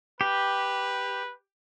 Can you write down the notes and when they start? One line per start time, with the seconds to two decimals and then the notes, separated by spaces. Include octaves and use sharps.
0.21 G4 B4